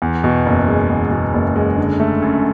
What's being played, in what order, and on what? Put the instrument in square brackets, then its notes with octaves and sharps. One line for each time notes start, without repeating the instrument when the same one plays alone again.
[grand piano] E2
B2
F#1
G#3
E2
B2
F#1
G#3
D3
A3
F#2